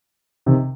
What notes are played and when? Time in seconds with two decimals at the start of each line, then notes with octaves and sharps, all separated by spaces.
0.46 C3 D#3